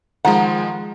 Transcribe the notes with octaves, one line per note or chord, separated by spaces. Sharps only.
D#3 F3 G#3 F#5 A#5